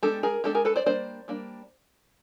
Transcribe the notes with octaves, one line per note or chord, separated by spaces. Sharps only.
G#3 B3 D4 G4 A4
G#4 A#4
G#3 B3 D4 G4 A4
G#4 A#4
A4 B4
C5 D5
G3 A#3 D4 C5 D5
G3 A#3 D4